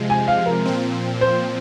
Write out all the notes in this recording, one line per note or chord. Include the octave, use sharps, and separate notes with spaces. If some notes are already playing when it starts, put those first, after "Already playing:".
Already playing: C3 F3 G#3
G#5
F5
A#4
A#2 F3 C4
C5